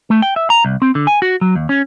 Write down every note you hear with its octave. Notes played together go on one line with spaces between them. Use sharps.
A3
G5
E5
A#5
C2
C4
D3
G#5
F#4
F#3
D#2
C#4